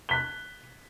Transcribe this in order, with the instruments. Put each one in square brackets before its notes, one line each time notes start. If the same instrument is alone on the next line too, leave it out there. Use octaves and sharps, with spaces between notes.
[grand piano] F#6 B6 G7